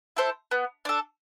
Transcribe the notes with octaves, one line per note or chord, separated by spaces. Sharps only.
E4 A4 C5
B3
D4 A4